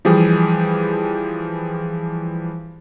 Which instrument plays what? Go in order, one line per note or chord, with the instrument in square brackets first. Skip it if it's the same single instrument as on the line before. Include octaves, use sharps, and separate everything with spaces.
[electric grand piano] E3 F3 G3 G4 G#4